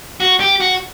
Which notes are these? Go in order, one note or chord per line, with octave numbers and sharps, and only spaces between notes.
F#4
G4
F#4